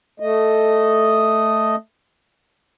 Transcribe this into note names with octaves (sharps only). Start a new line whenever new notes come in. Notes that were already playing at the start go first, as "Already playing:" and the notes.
A3 D#5